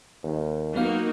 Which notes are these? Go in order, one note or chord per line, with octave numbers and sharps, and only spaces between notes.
D#2
F#3 A#3 B3 D#4 F#4 F5